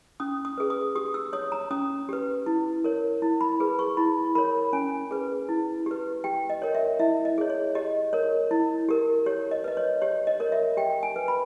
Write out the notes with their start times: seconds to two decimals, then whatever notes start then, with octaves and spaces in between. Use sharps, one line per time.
0.20 C#4 D#6
0.45 D#6
0.58 G#4 B4
0.70 D#6
0.95 G4 D#6
1.14 E6
1.33 C#5 D#6
1.52 A#5
1.71 C#4 D#6
2.09 G4 B4
2.46 E4
2.84 A#4 C#5
3.22 E4
3.41 B5
3.60 G#4 B4
3.79 C#6
3.97 E4 B5
4.35 A#4 C#5 B5
4.73 C#4 G#5
5.11 G#4 B4
5.49 E4
5.86 G4 B4
6.24 G4 G5
6.50 D#5
6.62 A#4 C#5
6.75 E5
6.99 E4 E5
7.25 D#5
7.38 G#4 C#5
7.50 C#5
7.75 G4 D#5
8.13 A#4 C#5
8.51 E4
8.89 G4 A#4
9.26 G4 C#5
9.51 D#5
9.64 B4 D#5
9.77 C#5
10.02 G4 C#5
10.27 D#5
10.40 A#4 C#5
10.52 E5
10.77 G4 G5
11.03 G#5
11.16 B4
11.28 B5